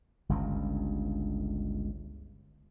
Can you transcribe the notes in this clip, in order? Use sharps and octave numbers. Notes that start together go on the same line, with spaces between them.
G1 C#2 G2